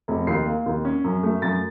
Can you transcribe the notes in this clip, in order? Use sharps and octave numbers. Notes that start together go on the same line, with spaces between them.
F1
D#2 C7
A#3
D#2
C#4
F#2
A3
F#2 A6